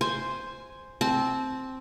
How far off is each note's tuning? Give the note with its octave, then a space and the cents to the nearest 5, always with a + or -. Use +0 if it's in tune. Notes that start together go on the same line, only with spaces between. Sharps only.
C5 +0 G#5 +0
C4 +0 A5 -25